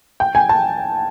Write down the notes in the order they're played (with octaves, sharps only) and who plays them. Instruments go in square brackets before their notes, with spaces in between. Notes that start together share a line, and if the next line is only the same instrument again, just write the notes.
[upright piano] G5
G#5
A5